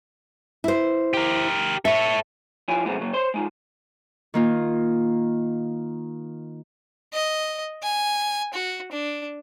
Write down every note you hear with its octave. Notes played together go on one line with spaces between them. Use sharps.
E4 C5
G4 A#4
A4 C#5 E5
F3 G3 E4 F4 C#5 G#5
C3 F#3 G#3 A3 B3 C4
C#3 F#3 A#3
C5 C#5 C6
G#3 D#4 F4
D#3 A#3 F4
D#5
G#5
F#4
D4